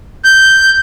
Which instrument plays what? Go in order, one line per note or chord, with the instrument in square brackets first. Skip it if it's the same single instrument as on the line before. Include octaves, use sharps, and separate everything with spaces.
[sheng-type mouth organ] G6